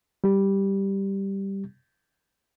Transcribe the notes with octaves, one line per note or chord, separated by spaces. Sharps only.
G3 G4